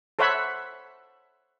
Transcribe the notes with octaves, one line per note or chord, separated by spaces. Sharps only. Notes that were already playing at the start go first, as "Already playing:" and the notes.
A4 C5 C#5 E5 F#5 B5